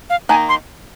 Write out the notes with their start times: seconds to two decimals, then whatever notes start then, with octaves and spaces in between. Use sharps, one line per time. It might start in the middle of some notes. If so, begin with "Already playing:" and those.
0.10 F5
0.29 D#3 A#3 D#4 G#5
0.49 C6